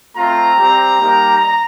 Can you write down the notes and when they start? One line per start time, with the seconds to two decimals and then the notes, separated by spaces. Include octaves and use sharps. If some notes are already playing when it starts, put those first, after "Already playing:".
0.15 A3 C4 F4 A#5
0.56 G3 C4 G4
0.97 G3 A#3 D#4 G4
1.37 A#5